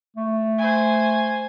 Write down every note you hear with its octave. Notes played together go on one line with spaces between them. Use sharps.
A3
C5 G#5